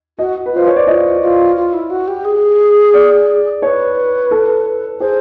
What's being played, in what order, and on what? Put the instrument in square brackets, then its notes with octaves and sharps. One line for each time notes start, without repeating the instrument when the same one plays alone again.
[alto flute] F#4 [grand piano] D#5
[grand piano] B4
[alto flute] F4 [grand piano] C5
[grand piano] C#5
D5
[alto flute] F4 [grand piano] D#5
[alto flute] F4
F4
E4
F#4
G4
G#4
[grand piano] D5
[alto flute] B4 [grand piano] C#5
[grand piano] A4
[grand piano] G#4 [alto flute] C5